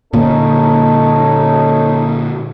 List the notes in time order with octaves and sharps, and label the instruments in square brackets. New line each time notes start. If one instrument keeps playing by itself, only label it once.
[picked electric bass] A#2 D3 A#3 [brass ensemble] C#4 D#4 A4